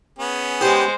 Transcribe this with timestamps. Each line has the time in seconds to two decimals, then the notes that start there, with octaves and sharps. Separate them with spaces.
0.19 B3 C#4 G#4
0.61 G#3 G4 C5